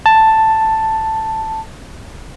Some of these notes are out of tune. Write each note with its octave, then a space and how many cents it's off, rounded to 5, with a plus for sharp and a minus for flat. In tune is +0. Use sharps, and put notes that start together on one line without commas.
A5 +5